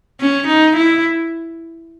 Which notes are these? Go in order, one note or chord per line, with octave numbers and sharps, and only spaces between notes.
C#4
D#4
E4